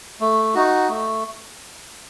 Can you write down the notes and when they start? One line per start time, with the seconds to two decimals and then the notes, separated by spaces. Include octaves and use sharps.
0.20 A3
0.54 D#4 F#4
0.89 A3